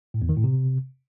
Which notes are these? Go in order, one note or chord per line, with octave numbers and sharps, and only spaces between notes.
A2
E2
D#3
A2
C3